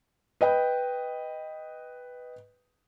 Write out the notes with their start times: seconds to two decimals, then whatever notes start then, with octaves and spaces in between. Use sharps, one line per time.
0.41 B4 D#5 G5